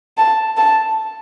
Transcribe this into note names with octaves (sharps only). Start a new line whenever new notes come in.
A5
A5